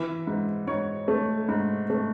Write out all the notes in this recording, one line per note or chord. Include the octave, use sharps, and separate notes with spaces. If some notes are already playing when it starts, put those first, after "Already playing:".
Already playing: E3 B4
G#2
G#2 C#5
A3
G#2
A3